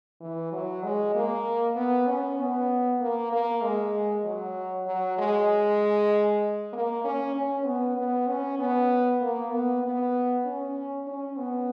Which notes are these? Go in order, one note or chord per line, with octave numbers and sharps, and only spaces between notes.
E3
F#3
G#3
A#3
B3
C#4
B3
A#3
A#3
G#3
F#3
F#3
G#3
A#3
C#4
C#4
B3
B3
C#4
B3
A#3
B3
B3
C#4
C#4
B3